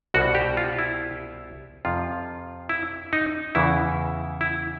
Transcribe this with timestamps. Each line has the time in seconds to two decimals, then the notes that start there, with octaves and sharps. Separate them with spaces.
0.14 C2 B2 G3 F#4
0.35 G4
0.57 F4
0.79 E4
1.85 F2 C3 F3 F4
2.69 E4
3.13 D#4
3.55 E2 C#3 E3 E4
4.41 E4